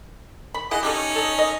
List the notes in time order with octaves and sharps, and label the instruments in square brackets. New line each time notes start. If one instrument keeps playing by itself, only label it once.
[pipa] B5
[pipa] E4 G#4 F#5 [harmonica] D#5
[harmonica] C#4 D#4 [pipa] G4 A4
[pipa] A4 D#5
D#5